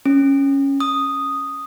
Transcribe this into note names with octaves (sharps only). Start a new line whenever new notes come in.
C#4
D#6